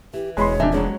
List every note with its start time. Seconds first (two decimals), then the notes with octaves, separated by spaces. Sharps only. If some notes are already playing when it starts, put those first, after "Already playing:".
0.14 E3 G4
0.37 E1 G#3 C#5 B5 C6
0.60 F2 D4 D#4 E5 G#5
0.73 F#3 G#3 C#4 G#4